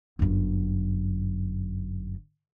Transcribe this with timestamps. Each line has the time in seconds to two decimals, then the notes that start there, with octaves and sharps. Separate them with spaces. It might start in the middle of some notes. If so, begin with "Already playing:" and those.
0.19 G1 F#2